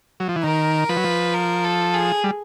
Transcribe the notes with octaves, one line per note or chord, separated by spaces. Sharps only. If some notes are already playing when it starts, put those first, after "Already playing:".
F#3
F3
E3
D#3 A#4
F3 B4
F#3
F3
A#4
A4
G#4
G3